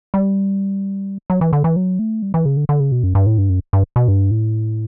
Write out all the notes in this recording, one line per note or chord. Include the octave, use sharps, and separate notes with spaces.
G3
F#3
E3
D3
E3
F#3
A3
G3
E3
C#3
D3
D3
C#3
B2
F#2
G2
A2
G2
F#2
G2
B2
G2
A2